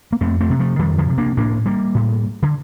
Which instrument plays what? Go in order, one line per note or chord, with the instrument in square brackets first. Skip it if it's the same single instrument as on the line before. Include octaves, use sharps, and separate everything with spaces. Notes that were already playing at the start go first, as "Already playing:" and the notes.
[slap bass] A#3
F2 A3 C4
A3 C4
C3
F3 A3
F2 D#3 G3
D3 F3
C3
A#3 D4
A2 A#3 D4
G3 A#3
A2
D3